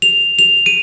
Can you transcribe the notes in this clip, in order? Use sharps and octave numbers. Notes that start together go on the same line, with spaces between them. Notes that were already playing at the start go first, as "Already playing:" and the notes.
F7
F7
D#7